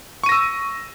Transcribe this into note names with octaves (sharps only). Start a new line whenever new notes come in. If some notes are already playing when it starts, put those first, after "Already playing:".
C#6 E6 A#6 D#7